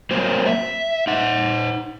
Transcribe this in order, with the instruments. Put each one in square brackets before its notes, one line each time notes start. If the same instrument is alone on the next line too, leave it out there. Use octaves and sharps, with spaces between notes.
[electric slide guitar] F#3 A#3 C4 C5
E5
D#4 F#5